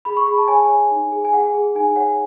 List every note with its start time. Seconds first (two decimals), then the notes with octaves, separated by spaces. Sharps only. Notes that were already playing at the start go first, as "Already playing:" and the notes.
0.05 G#4 B5
0.17 C#6
0.27 G#4 B5
0.38 A5
0.48 C#5 G#5
0.69 C#5
0.91 D#4
1.12 G#4
1.25 G#5
1.33 G#4 F#5
1.54 G#4
1.75 D#4 G#5
1.96 C#5 F#5